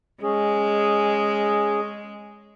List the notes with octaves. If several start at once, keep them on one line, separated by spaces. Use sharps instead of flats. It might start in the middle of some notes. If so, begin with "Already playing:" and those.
G#3 C#4 G#4